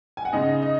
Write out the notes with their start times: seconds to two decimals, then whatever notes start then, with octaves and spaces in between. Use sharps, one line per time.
0.17 G#5
0.25 F#5
0.33 C#3 G#3 D#4 D#5
0.62 D#5